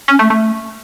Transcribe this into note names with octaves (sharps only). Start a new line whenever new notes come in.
C#4
A3
A3